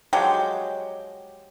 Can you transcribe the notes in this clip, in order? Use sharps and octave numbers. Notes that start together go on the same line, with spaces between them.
F3 F#3 G#3 G4